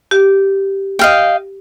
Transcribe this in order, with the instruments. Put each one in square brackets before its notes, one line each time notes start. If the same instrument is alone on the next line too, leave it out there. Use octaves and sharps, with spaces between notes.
[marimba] G4
[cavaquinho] D#5 F5 G5